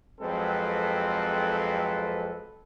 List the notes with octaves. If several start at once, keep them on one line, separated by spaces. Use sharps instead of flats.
F2 F#3 G#3 C4 A4 B4